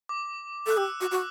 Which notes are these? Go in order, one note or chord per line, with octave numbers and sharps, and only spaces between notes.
D6
A4 F#6
G4 E6
F#4 D6
F#4